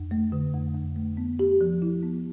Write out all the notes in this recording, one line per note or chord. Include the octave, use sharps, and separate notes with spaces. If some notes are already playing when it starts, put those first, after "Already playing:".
Already playing: F2
A3
D3
F2
F2
A3
B3
G4
F3
E4
B3